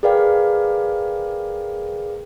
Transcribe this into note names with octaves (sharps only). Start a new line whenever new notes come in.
G#4 A#4 B4 D5 F5 G5